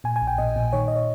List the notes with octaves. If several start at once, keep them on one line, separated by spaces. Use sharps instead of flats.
A#2 G#5
G#5
A#1
G5
A#2 D#5
A#2
D#3 C#5
D#5
C#5